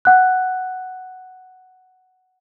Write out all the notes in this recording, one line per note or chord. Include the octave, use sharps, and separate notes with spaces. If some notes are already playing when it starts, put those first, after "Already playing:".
F#5 F#6